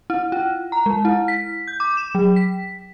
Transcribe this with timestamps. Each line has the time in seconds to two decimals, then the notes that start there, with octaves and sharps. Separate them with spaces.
0.10 E4
0.32 F4
0.72 A#5
0.86 G#3
1.05 E4
1.28 B6
1.68 G6
1.80 D6
1.97 E7
2.15 F#3
2.36 B6